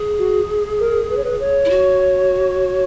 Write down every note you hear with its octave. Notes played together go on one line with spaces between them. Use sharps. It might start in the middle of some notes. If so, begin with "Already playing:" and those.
Already playing: G#4
F#4
A#4
B4
C#5
B4
C#5
E4
F#4